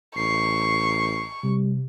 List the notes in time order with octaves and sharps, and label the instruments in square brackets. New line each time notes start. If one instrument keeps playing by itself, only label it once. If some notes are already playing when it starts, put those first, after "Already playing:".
[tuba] A1 [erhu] C#6 [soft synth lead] C7
[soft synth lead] C3 [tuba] G3